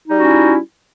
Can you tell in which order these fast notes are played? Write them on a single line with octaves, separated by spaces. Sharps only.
D#4 G3 F#4 C#4 E4